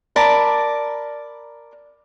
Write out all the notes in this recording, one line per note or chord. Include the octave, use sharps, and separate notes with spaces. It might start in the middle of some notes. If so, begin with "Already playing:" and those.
A#4 D5 A5 B5